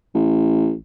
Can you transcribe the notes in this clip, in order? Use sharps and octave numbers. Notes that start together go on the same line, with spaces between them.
A1